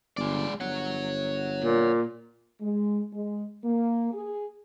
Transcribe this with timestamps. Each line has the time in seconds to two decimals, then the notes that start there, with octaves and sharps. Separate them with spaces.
0.17 G1 G#3 D5
0.61 G1 C#5 F#5
1.65 A#2
2.60 G#3
3.13 G#3
3.64 A#3
4.13 G#4